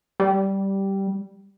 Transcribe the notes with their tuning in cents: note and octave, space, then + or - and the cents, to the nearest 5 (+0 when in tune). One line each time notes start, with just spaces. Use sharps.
G3 -10